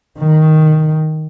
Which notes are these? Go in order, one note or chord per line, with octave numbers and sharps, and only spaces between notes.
D#3